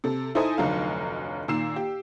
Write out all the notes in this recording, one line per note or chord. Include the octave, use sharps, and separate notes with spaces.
C3 A4
D#4 E4 A4 C5 G#5 D#6
F1 D2 F#3 D#4 F5
A#2 D#3 A#5 E6 C7 E7
G4